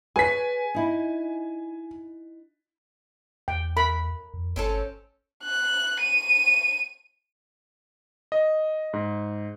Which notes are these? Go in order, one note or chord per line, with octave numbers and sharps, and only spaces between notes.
G#4 B4 C#5 G#5 B6
D#4 E4
E2 G5
A#4 B5
F2
G1 C4 C#4 A4
F#6
D#7
D#5
G#2